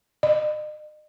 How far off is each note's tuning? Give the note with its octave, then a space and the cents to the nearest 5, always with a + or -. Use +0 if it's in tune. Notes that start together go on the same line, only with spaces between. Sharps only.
D#5 -40